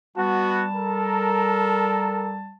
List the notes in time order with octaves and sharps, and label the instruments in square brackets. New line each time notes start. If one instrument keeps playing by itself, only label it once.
[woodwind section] G3 A5 [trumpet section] B3 F#4
[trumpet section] A4 A#4